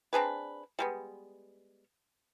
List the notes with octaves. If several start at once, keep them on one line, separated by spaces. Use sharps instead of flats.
C4 D4 G#4 B4
G3 G#3 B3